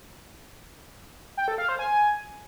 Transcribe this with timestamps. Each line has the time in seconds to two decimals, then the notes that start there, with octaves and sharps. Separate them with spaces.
1.37 G5
1.48 A4
1.58 F5
1.69 C5
1.79 G#5